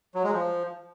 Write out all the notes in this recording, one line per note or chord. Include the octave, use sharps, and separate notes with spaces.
F#3
G#3
F3